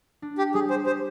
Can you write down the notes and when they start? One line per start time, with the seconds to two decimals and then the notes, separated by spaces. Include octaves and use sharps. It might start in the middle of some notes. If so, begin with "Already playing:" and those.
0.22 D4
0.38 G4
0.54 G3 G#4
0.70 C5
0.86 G4 C5